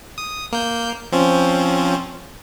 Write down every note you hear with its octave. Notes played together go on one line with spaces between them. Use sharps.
D#6
A#3 G6
F3 C4 C#4